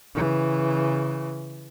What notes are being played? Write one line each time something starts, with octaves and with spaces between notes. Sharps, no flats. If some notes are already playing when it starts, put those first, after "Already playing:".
C#3 E3